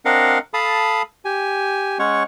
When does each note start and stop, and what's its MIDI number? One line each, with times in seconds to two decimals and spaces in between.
0.05 0.39 60
0.05 0.39 62
0.05 0.39 70
0.05 0.39 75
0.05 0.39 77
0.05 0.39 78
0.54 1.02 69
0.54 1.02 77
0.54 1.02 81
0.54 1.02 83
0.54 1.02 87
1.25 1.98 67
1.25 1.98 80
1.99 2.23 56
1.99 2.23 61
1.99 2.23 73
1.99 2.23 78
1.99 2.23 85